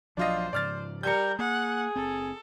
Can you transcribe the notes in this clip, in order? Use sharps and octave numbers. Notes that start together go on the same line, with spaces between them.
A#1 F3 F#3 D4 F4 C5 D#5
G#2 C#3 F3 D5 F6 A6
G3 A#4 G6 C#7
A#3 G#4 F#5
F#1 C4 A4